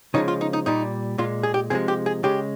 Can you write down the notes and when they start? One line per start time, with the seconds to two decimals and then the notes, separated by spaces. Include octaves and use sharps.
0.14 C#3 F3 G#3 D#4
0.28 F4
0.41 D#4
0.53 D#4
0.66 A#2 G3 D#4
1.18 A#2 G#3 F4
1.43 G#4
1.54 G4
1.70 C3 F3 G#3 G#4
1.88 G4
2.06 G#4
2.23 C#3 G#3 G4